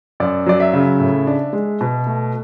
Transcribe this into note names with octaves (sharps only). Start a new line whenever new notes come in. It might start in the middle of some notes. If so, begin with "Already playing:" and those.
F#2 D5
F#3 D5
E5
C#3
A2
D4
G#3
B2
A3